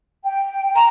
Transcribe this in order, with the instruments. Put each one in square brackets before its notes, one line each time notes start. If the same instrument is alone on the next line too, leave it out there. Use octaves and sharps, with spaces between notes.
[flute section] G5
[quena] A#5